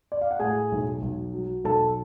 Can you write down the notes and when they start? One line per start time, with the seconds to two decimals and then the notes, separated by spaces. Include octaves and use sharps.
0.12 D5
0.21 F5
0.31 F#5
0.39 A2 G#4 G#5
0.72 B1
1.02 B1
1.34 F#3
1.64 B1 A4 A5